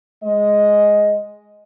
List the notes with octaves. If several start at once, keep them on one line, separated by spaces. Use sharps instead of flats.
G#3 D#5